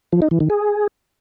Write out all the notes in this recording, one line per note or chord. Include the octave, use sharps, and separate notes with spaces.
F3
D#4
E3
D#3
G#4